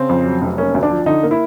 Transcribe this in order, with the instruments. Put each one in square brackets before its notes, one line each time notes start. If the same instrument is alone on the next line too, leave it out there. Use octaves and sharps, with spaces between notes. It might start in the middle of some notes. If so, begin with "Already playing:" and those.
Already playing: [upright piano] C#3 C4
F2
F#3
F1
A#3 C#4
D2
D4
F3
D3 D#4
A#3
E4